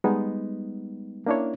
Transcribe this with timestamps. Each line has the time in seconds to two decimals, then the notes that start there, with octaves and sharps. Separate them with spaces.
0.04 G3 G#3 B3 D#4
1.26 A#3 C#4 D4 E4 C#5